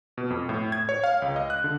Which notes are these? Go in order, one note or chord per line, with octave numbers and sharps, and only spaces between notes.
B2
F2
A2
G#6
C#5
F5
C#2
D#5
F#6
D3